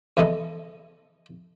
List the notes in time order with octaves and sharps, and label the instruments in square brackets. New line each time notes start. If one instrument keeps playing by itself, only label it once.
[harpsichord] E2 E3 G#3 A4 D#5